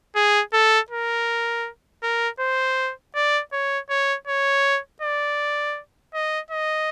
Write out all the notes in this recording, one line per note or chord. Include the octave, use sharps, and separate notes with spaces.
G#4
A4
A#4
A#4
C5
D5
C#5
C#5
C#5
D5
D#5
D#5